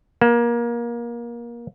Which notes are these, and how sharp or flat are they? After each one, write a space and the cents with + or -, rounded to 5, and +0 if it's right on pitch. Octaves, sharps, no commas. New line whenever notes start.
A#3 +25